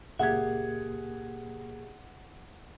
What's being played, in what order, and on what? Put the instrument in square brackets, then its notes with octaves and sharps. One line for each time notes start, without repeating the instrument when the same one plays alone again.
[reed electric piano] C#2 A#2 A#3 [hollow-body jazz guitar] G4 E5 [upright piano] G#4 G#6 [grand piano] F#5